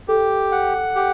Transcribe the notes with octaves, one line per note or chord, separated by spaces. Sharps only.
G4 A4
F#5
G4